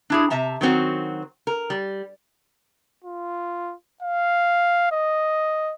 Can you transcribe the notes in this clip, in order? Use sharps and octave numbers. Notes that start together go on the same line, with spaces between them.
D4 E4 G#4
C3 E5 A5 A#5
D#3 F#3 C4 F#4
A#4
G3
F4
F5
D#5